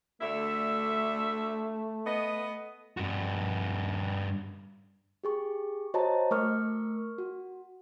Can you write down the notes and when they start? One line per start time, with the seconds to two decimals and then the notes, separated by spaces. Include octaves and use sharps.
0.21 D2 D3 A3 E5
2.05 B3 D#5
2.97 G2 F#4
5.24 G4 G#4 C#6
5.94 F#4 C5 C#5 D#5 A5 A#5
6.31 A3 A#4 C#6 F6
7.18 F#4